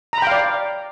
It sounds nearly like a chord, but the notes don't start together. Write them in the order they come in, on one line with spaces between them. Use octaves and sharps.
A#5 B5 G5 F5 D5